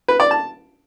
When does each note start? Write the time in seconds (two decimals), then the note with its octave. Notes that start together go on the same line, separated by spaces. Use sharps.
0.08 B4
0.20 D5
0.31 A5